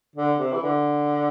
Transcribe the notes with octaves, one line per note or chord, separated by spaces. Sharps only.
D3
C3
E3
D3